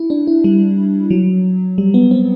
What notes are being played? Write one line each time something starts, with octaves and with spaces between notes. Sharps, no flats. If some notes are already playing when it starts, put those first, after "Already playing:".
Already playing: E4
D4
E4
G3
F#3
G3
B3
C4